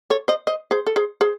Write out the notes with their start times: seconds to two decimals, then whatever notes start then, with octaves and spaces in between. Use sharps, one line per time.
0.10 A4 C#5
0.28 C5 D#5
0.47 C5 D#5
0.71 G#4 C5
0.87 A4
0.96 G#4 C5
1.21 G#4 C5